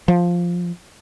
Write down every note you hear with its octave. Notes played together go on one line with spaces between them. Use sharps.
F3